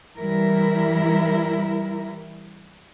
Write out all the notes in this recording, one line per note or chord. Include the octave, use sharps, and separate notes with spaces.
E3 G3 E4 A#4